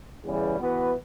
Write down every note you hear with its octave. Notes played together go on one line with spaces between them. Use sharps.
E2 C#3 E3 G3
E3 B3 F#4 B4